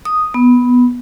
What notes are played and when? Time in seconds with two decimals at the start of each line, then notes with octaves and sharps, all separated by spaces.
0.05 D#6
0.34 B3